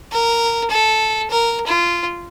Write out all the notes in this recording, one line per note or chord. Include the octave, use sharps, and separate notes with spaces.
A#4
A4
A#4
F4